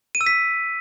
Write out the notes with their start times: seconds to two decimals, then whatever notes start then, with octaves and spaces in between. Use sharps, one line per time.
0.15 D#7
0.21 E6
0.26 B6